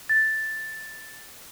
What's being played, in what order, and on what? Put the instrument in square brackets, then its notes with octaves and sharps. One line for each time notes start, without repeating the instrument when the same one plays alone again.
[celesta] A6